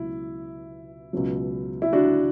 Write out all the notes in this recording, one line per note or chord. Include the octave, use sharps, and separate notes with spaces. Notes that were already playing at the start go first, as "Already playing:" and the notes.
Already playing: C#2 B2 F#3 E4
C#2 B2 F#3
E4
D4 F#4